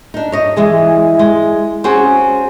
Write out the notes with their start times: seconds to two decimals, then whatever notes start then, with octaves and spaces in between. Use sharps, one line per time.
0.14 D4 D#4
0.32 C#5 D#5
0.56 E3 G#3 G#4
1.19 G#3
1.84 C4 C#4 F#4 G#4